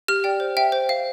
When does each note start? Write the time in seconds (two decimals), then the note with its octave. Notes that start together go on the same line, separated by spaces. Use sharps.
0.08 G4 F6
0.24 D5 G5
0.40 C5
0.57 E5 G5
0.72 C5
0.89 F5